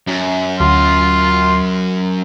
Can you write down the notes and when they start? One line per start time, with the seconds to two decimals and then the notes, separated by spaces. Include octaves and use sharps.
0.07 F#2
0.60 D2 C6 F6